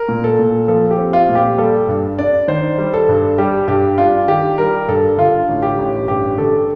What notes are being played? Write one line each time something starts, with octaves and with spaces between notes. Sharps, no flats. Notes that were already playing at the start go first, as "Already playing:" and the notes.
Already playing: A#4
A#2
A4
A#2
F3 A4
G4
C4
F4
A#2
G4
G3 A4
G2
D4 D5
D#3 C5
G3
A4
G2
G3 G4
G2 G4
D4 F4
D#3 G4
G3 A#4
G2 A4
D3 F4
A1
G4
A1
G2 G4
D3 A4